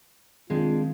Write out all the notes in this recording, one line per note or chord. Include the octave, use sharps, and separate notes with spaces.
C2 D#3 G#3 C4 D4 F4 F5